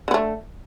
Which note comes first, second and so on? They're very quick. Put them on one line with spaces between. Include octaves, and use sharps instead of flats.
D3 B3 A3